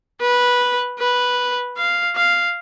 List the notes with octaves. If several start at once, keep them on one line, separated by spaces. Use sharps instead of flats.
B4
B4
F5
F5